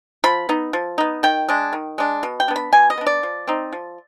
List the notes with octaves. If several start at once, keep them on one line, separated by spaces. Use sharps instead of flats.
F3 B5
B3 D#4
F3
B3 D#4
D#3 G5
G#3 D4
D#3
G#3 D4
B2
G5
B3 D4
B5
B2 G#5
D#5
B3 D4
D5
F3
C4 D#4
F3